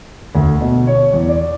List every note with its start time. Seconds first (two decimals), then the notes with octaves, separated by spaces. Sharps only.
0.35 D2
0.61 B2
0.87 C#5
1.13 E2
1.28 D5